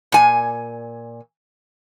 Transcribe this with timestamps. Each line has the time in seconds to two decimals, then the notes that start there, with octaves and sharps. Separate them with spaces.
0.12 A#2 G#5